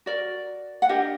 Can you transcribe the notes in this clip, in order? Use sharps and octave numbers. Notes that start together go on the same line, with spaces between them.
F#4 A#4 D5
F#5
D4 G4 A#4 D#5